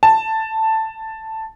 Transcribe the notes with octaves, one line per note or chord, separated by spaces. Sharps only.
A5